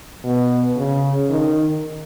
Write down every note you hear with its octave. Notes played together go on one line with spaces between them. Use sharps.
B2
C#3
D#3